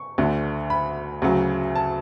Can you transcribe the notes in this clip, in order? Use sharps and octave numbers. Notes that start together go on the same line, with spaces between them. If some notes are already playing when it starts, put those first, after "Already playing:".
Already playing: C#6
D2 D3 A3
B5
D2 C#3 F#3
A5